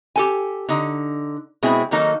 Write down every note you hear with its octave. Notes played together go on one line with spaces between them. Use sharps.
G4 A4 G#5
D3 D#4
B2 G#3 C4 E4 G#4
D#3 F#3 A#3 D#4 A4